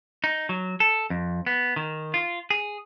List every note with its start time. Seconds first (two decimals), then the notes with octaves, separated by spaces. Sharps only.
0.24 D#4
0.49 F#3
0.80 A4
1.10 F2
1.46 B3
1.76 D#3
2.14 F4
2.50 G#4